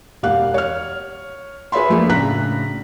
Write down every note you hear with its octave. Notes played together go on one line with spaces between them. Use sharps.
E1 G4 F5 F#5 F#6
C#5 F6
G#4 B4 C#5 E5 B5 C6
F3 F#3 A3 A#3 D4 G#4
A2 C#3 D4 A#5 F#6 B6